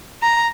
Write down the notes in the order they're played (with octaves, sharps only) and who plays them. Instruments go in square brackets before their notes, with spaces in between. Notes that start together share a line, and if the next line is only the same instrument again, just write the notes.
[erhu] A#5